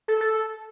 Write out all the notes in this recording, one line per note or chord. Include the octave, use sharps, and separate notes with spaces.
A4
A4